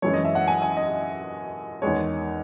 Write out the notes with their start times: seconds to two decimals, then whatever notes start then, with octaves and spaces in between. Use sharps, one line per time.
0.02 F#2 E3 G#3 C#5
0.14 D#5
0.25 E5
0.35 F#5
0.48 G#5
0.62 G#5
0.77 D#5
1.82 E2 D#3 G#3 C#5